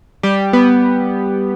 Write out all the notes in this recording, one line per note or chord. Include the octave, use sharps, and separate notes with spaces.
G3 G4
B3